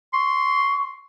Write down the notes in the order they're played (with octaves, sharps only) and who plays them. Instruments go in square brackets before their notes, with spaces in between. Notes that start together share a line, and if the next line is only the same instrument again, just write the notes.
[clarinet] C6 [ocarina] C#6